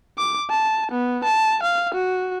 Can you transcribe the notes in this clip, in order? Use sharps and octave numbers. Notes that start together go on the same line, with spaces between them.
D6
A5
B3
A5
F5
F#4